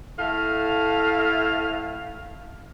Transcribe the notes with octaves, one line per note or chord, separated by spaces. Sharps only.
A2 A3 F5